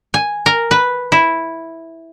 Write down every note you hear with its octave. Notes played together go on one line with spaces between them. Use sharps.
G#5
A#4
B4
E4